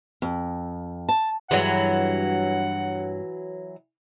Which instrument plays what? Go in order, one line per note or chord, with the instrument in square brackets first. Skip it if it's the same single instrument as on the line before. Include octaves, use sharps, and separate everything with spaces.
[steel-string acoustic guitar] F2
A5
[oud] G2 G#3 [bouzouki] E3 F#3 [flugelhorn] F#5